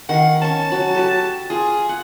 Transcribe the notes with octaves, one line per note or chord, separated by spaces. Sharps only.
D#3 F5 F#5
C#4 A5 C#6
F#3 F#4
F#4 G4 A4
F4 G#4
F#5